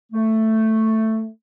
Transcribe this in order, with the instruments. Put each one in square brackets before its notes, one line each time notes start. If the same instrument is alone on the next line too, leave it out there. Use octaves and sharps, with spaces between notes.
[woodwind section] A3